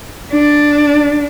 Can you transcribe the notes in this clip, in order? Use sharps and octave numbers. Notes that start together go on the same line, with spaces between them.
D4